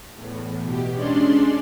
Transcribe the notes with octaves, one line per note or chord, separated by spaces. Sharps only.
E2 A2
B2 G4
G#3 C#4 D4 D5 C6